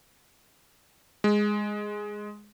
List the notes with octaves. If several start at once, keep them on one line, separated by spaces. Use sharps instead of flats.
G#3